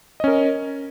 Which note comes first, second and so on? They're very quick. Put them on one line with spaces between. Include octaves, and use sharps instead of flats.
D#5 C#4 A#4